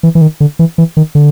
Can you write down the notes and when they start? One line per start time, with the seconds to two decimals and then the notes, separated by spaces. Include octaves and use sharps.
0.03 E3
0.15 E3
0.21 D#3
0.40 D3
0.59 E3
0.78 E3
0.97 D#3
1.15 D3